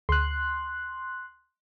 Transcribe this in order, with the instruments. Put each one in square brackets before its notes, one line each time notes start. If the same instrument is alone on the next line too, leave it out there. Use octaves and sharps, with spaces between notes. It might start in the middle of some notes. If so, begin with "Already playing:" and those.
[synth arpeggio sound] D2 [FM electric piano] C6 F#6